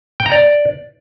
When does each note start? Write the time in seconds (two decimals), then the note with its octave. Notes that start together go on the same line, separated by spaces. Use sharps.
0.20 G5
0.26 A#5
0.32 D5